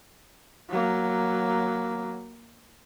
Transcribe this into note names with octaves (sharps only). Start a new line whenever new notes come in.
F#3 A#3